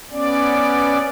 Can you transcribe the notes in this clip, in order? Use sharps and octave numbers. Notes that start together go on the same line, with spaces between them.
B3 C#4 D5